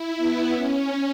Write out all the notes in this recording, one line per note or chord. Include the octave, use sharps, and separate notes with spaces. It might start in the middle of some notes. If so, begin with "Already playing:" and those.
Already playing: E4
B3
C#4